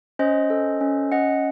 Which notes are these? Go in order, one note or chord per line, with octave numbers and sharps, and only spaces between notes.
C#4 C5 D#5
A4
C#4
C#4 D#5 F#5